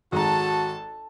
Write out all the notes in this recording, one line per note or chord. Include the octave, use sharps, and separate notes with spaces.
G#1 G#3 F#4 A4 A5 A#5